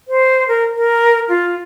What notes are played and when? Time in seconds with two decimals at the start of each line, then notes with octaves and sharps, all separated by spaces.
0.08 C5
0.48 A#4
0.75 A#4
1.29 F4